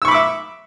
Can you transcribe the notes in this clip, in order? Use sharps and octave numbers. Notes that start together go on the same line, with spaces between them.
E5 B5 C#6 D6 E6